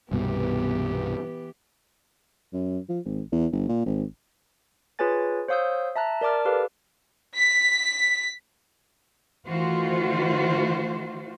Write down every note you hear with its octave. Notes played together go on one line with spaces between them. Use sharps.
C2 G2 B2 E3 B3 G4
F#2
F3
G#1
E2
G1
A#2
G#1
F4 G#4 B4 C#5 G#5 A6
C5 C#5 F5 D#6 E6 G6
E5 A5 A#5 F#6
A#4 D5 A5 D6 F6
G4 A4 B4 F5
B6
D#3 E3 A3 F4 F#4 C5